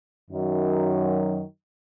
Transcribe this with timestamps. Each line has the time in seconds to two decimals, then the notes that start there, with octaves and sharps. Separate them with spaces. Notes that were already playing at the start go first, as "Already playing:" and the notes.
0.30 F#2 D#3 F#3